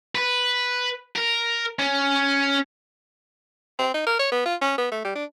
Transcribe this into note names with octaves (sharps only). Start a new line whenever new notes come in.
B4
A#4
C#4
C4
D#4
A#4
C#5
B3
F4
C#4
B3
A3
G3
D4